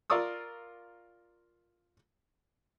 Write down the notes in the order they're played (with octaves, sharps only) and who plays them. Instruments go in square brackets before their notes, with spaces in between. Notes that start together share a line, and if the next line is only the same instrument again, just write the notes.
[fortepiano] F4 A#4 D5 C#6 D#6 E6